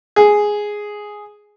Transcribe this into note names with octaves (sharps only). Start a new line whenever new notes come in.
G#4